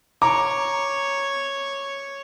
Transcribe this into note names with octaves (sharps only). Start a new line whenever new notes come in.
C#5 A#5 D6